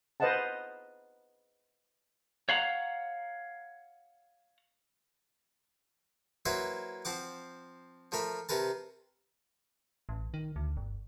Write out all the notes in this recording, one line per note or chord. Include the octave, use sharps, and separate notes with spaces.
B4 C5 D#5 F5 F#5 A5
C#5 F5 F#5 A#5
F#3 A#3 E4 B4 C5 E5
F3 C4 F#5 D6
F3 A3 A#4 B5
C3 A#4 B4 A5
A1
D#3
D2
G1